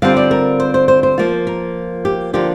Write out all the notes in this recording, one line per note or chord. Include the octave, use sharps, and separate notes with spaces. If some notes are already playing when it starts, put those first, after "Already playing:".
D3 G3 C4 F4 F5
D5
A#4
C5
C5
C5
C5
F3 A#3 F4
A#4
G4
D3 F3 A#3 D4 F4 G4